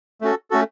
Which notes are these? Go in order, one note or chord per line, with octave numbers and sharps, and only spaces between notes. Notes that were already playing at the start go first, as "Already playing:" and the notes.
A3 C#4 F#4 A4
A3 C#4 F#4 A4